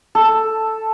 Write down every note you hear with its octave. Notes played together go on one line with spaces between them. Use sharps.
A4